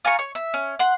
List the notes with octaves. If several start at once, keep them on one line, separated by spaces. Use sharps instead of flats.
F4 G#5 A#5 C#6
C#5
E5
C#4
F#5 C6